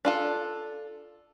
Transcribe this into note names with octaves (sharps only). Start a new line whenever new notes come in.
D4 F4 A4